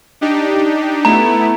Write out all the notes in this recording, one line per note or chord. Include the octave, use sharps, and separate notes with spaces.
D4 D#4 G4
A3 B3 E4 A#5